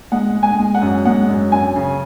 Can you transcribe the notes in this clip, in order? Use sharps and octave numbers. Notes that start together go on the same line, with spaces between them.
G#3 F#5
G#3
G#5
G#3
F#5
F#2
G#3 F#5
F#2
F#2 G#5
C#3